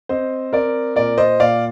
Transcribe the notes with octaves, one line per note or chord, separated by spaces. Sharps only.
C4 C5 D#5
C4 A#4 D5
A#2 A#4 D5
C5 D#5
A#2 D5 F5